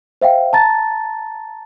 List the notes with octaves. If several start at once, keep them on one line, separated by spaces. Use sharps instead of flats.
C5 E5 F5 G5
A5 A#5 A6